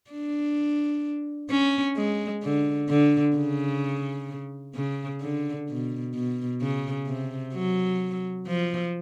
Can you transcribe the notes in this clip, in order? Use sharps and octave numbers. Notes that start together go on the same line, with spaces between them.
D4
C#4
G#3
D3
D3
C#3
C#3
D3
B2
B2
C#3
C3
F#3
F3